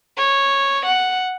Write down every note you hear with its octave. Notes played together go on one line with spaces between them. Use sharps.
C#5
F#5